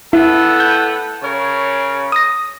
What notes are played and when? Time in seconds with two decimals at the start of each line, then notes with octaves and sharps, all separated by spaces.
0.13 A2 B3 E4 A4
0.60 G6
1.23 C#3 A#4 C#5
2.12 D#6 A#6